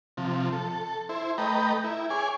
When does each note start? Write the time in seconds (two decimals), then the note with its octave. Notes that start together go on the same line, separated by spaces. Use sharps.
0.17 C3 F3
0.52 A4
1.09 E4 C5
1.38 A3 B4 D#5 G5 A#5
1.84 E4
2.10 G#4 C#5 G#5 D6